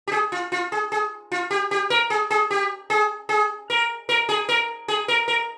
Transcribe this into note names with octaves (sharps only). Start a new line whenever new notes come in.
G4
G#4
F4
F4
G#4
G#4
F4
G4
G4
A#4
G#4
G#4
G4
G#4
G#4
A#4
A#4
G#4
A#4
G#4
A#4
A#4